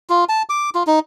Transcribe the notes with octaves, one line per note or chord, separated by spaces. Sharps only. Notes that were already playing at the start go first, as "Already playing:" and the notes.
F4
A5
D6
F4
D#4